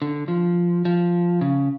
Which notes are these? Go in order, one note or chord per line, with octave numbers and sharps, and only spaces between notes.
D3
F3
F3
C#3